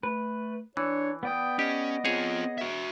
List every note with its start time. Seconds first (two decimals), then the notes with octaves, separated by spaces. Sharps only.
0.03 A3 B4
0.77 E3 D4 C#5
1.23 B3 D5 G5 D#6
1.59 C#4 G4 D#5
2.05 C4 F4 G#4 C#5
2.58 F#4 E5